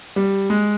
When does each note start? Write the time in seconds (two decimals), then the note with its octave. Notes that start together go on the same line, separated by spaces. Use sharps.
0.16 G3
0.50 G#3